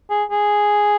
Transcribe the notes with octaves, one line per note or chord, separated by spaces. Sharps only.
G#4
G#4